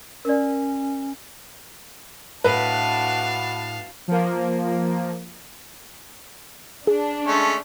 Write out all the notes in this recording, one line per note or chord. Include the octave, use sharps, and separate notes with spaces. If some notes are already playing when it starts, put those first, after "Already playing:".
C#4 A#4 D5
A2 D4 F#4 B4 F5 A5
F3 A#3
D4 G#4
G#3 A3 C#4